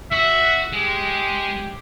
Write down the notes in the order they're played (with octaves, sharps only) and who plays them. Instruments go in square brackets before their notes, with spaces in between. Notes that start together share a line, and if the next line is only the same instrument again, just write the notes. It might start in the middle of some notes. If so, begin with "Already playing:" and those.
[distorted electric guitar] F#4 [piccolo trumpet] E5
[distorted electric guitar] G#3 [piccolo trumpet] G4